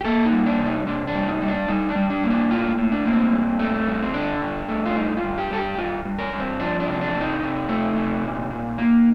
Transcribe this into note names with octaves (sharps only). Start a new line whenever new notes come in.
G4
A#3 A4
D#4
G3
D4
C3
D#4
C3 D4
D4
G3
D#4
G3
D4
G3 D#4
D4
G3
D4
A#3
D4
A2 F4
A2
D4
A#3
C4
G2
A3
G2
C4
D3 D4
G2
A3
F4
G2 D#4
F4
G2
G4
G2 A4
G4
G2 F4
G2
A#4
G2
C4
F3 D4
D4
C3
D4
C3
D#4
C3
A3
C3
A#2
A#2
A#3